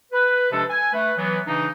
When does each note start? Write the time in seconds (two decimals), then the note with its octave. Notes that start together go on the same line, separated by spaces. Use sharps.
0.12 B4
0.51 C3 F3 G#3 D4 A4
0.69 G#5
0.92 A3 B4
1.17 E3 F#3 B3
1.46 C#3 E3 D4 D#4